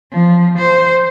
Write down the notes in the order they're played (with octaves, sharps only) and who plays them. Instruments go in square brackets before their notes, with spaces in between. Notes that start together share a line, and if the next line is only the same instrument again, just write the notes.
[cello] F3
C5